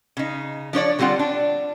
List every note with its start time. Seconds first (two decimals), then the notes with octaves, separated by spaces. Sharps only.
0.17 C#3 D#4
0.73 F3 D4 C#5 D5
0.99 D3 G3 C4 F4 F#5
1.19 D4